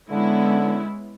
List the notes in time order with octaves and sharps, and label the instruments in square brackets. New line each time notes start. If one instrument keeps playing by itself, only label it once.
[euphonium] D3 [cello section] G#3 [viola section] B3 C#4 E4